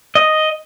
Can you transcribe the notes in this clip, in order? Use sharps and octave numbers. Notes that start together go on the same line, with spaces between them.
D#5